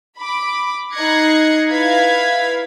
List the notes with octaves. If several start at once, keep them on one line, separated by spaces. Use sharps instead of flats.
B5 D6
D#4 F#6 G#6 A#6 C7 C#7
E4 B4 F5 G#6 B6